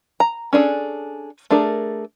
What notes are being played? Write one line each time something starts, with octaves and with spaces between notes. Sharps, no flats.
A#5
C#4 D4 G#4 A4
A3 D4 G#4 A#4